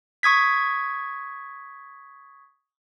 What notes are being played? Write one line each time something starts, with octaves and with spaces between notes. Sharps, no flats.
C#6 D#6 G#6 B6